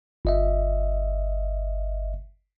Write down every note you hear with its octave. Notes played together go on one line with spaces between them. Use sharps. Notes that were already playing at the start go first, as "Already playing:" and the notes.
G1 D#5 E5